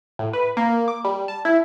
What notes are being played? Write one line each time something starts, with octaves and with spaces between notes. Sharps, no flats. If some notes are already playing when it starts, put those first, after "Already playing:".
A2
B4
A#3
D6
G3
A5
E4